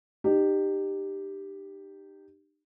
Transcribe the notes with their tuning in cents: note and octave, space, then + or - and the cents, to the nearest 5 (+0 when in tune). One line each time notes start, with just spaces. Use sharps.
D#4 -40 G4 +0